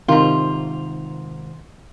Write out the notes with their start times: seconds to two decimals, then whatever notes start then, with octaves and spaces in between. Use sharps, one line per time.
0.08 G#2 C3 D#3 F4